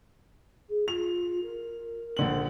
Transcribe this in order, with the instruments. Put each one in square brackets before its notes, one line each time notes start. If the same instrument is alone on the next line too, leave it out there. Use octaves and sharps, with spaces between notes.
[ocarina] G#4
[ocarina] F4 [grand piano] F7
[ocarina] A#4
[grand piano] A#1 D3 F#7